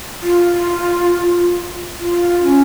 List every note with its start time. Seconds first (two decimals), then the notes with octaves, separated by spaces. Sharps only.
0.23 F4
1.99 F4
2.43 C#4